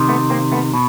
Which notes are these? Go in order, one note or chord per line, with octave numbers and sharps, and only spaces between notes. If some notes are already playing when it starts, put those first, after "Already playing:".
Already playing: C3 D#3
A3 B3
A#3 C4
A3 B3
B2